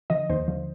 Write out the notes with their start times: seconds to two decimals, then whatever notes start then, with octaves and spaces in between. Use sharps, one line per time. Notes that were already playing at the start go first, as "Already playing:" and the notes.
0.10 D3 F3 D#5
0.29 D#2 C5
0.48 D3 F3